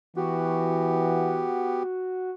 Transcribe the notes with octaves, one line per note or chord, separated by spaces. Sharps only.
E3 B3 F#4 G4